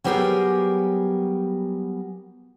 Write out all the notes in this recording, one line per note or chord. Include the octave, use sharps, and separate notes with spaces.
F#3 G3 B3 G4 G#4 A#4